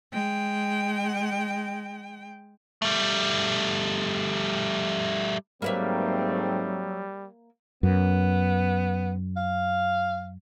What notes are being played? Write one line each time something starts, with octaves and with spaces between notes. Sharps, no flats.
G#3 G5
G3 A3
G#2 F#3 G3 A3 A#3 C4 B4 E5
F#2 B3
F5